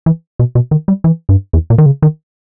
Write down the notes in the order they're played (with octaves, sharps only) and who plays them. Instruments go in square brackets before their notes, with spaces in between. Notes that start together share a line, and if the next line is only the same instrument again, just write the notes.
[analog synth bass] E3
B2
B2
D#3
G3
E3
G2
E2
A#2
D#3
C#3
D#3